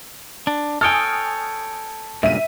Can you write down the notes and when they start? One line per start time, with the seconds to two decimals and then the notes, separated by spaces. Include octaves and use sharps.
0.47 D4
0.81 A4 C#5 G5 G#5 D#6 F6
2.23 C#2 G2 A#2 E5 D#7